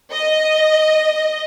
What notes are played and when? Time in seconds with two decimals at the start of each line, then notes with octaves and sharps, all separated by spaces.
0.12 D#5